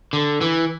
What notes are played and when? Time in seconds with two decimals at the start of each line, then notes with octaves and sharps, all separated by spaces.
0.13 D3
0.41 E3